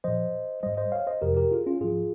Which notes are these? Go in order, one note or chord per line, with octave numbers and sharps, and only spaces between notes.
A#2 F3 C5 D#5
G#2 G3 C5 D#5
C5 D#5
C#5 F5
C5 D#5
F2 C3 F3 G4 A#4
G4 A#4
F4 G#4
C#4 F4
G#2 F3 F4 G#4